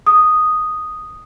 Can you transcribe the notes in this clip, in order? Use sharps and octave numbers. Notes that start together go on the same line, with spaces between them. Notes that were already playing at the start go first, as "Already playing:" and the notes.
D#6